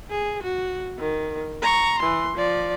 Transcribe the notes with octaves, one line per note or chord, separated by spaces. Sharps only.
G#4
F#4
D#3
A#5 C#6
E3 C6
F3 D5